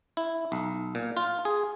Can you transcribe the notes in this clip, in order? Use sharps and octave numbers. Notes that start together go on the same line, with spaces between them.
E4
B1
A#2
F4
G#4